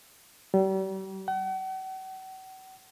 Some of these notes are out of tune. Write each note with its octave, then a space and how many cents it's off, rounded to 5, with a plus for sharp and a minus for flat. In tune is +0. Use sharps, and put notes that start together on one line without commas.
G3 -40
F#5 +40